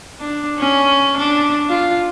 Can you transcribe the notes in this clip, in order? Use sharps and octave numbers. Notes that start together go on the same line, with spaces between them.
D4
C#4
D4
F4